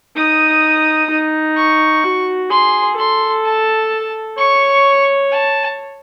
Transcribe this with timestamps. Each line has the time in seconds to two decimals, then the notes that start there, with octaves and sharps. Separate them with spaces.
0.16 D#4 D#6
1.10 D#4
1.56 C#6
2.04 F#4
2.50 G#4 C6
2.98 A4 C6
3.45 A5
4.38 C#5 C#6
5.32 A5